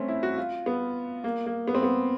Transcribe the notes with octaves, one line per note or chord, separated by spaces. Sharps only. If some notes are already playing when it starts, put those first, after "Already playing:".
Already playing: A3 C4 C#4
E4
F#4
F4
B3
A#3
A#3
B3
C4
B3